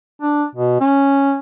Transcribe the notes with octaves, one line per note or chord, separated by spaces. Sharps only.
D4
B2
C#4